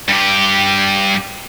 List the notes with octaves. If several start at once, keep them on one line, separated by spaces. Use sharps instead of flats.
G2 G4